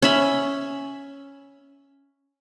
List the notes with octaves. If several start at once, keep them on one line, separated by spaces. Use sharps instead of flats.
C#4 E5 B5